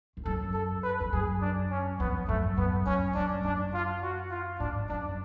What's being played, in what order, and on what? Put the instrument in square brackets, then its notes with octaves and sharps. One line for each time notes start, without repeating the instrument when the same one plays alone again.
[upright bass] F2
[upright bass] F#2 [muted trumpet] A4
[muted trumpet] A4
B4
[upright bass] F2
[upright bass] F#2 [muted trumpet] G#4
[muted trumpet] D4
C#4
[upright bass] F2 [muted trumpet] B3
[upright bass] F#2 [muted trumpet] A3
[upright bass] F#2 [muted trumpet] B3
[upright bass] F#2 [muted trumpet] C#4
[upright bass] F#2 [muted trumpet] D4
[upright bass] F#2 [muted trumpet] D4
[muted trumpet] F4
F#4
F4
[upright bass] G#2 [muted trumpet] D4
[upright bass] F#2 [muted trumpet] D4